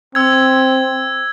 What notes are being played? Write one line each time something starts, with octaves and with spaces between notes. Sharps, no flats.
C4 E6 G#6